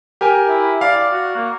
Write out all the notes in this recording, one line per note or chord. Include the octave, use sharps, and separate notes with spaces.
G4 A#4 G#5
E4
D5 F5
F#4
A#3